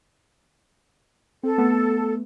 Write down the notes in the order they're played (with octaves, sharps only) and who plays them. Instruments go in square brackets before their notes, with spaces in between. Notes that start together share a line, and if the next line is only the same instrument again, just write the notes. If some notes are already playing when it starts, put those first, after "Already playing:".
[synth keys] C4 [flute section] A4
[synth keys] A3 B3